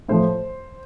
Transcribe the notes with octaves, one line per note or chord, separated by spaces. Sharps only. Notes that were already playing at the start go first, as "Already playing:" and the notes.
A2 F3 C5